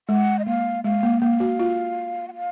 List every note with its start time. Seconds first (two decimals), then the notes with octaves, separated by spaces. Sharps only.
0.09 G#3 F#5
0.39 D#5
0.46 A#3 F5
0.84 G#3 F5
1.03 A#3
1.22 A#3 F5
1.40 F#4
1.60 F4
2.28 F#5
2.34 F5